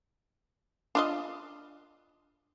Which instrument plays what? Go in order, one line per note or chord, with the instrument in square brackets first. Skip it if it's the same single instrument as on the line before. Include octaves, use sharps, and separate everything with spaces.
[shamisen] D4 F4 D#5